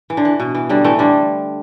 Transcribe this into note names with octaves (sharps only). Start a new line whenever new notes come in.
E3
D3
E3
B2
E3
D3 G3
E3 A3
D3 G3